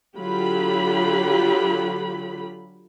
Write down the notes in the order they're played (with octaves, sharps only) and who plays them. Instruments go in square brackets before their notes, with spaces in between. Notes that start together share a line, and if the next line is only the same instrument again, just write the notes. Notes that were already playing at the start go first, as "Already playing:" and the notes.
[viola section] D3 F#3 F4 G4 B5